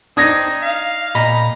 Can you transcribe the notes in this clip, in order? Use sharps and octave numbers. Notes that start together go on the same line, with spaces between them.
C4 D4 D#4 D#6 G#6 A#6
F5
A#2 D#5 A#5 B5